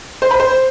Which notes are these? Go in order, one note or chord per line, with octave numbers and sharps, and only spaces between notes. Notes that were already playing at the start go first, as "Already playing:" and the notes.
C5
B5
C5